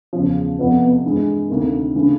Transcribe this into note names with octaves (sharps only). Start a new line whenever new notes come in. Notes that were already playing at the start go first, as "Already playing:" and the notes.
E2 C#3 F3
F2 C3 F3 B3
G2 E3 G#3
D2 C3 D#3 A#3
C#3 E3 A3 D4